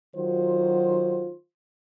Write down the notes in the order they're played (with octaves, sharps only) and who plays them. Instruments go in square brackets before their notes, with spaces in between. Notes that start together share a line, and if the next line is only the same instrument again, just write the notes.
[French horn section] D#3 F#3 F4 F#4 C5